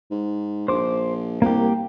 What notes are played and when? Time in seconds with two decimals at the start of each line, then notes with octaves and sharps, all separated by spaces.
0.11 G#2
0.68 A#1 C5 D6
1.42 C2 A#3 G4